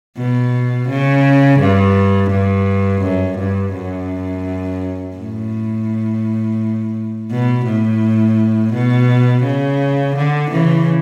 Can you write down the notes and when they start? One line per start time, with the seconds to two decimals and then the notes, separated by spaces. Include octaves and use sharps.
0.17 B2
0.90 C#3
1.61 G2
2.31 G2
3.03 F#2
3.39 G2
3.74 F#2
5.16 A2
7.31 B2
7.66 A2
8.74 B2
9.44 C#3
10.17 D3
10.51 C#3 E3